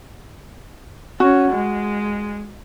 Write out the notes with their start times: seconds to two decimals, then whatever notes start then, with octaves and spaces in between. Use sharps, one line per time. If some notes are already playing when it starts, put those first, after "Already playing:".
1.20 C#4 F#4
1.51 G#3